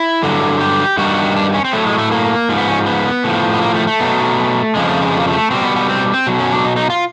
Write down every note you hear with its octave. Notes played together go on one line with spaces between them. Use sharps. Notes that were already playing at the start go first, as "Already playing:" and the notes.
Already playing: E4
G2 D3 F#3
G4
G2 D#3 G3 F#4
D4
C#4
C4
A2 F#3 A3
G#3
A3
A#3
G#2 F3
B3
C#4
B3
A2 F3
B3
A#3
A3
A3
B2 F#3
F2 C#3 F3 G#3
A3
G#3
A3
A#3
A3
B2 G3 C4
B3
B3
C4
C4
B2 F#3
C#4
D4
D#4
D#4
F4